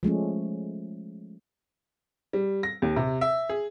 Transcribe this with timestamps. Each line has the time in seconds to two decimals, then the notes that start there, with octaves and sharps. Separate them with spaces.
0.03 F3 G#3 A3 C#4
2.33 G3
2.63 A#6
2.82 D#2
2.96 C3
3.21 E5
3.49 G#4